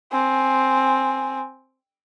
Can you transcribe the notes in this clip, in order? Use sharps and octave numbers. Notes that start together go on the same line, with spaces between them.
C4 G#5